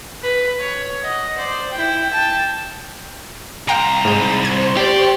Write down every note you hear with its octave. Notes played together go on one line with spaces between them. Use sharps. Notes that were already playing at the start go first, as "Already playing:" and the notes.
B4
C#5
D#5 F#5
C5 D5
E4 G5
G5 A5
C2 F5 G5 A#5 C6
G#2 B5 G6 A6
C5 C6 C#6 G#6
G4 D5